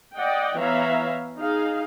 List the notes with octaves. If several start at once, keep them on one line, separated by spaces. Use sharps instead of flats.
D5 D#5 F#5 G5
E3 B3 C#5 E5 F5 A#5
D#4 G#4 F5